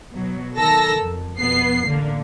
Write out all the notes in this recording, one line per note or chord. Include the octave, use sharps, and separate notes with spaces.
B2 F#3
D#3 A4 A#4 A5 E6 A#6
F2
F2 B2 B3 C7
A1 D3 A#3